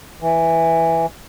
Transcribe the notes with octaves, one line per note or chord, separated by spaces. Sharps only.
E3